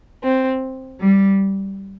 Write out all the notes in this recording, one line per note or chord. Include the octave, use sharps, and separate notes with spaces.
C4
G3